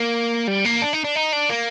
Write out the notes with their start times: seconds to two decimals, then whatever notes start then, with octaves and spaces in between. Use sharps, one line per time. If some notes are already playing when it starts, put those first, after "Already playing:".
Already playing: A#3
0.48 G3
0.65 A#3
0.82 D4
0.93 D#4
1.04 D4
1.16 D#4
1.33 D4
1.50 A#3